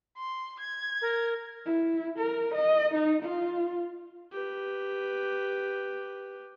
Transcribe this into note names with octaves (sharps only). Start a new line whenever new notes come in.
C6
G#6
A#4
E4
A#4
D#5
D#4
F4
G4 B4